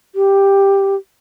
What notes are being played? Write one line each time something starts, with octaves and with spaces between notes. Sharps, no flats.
G4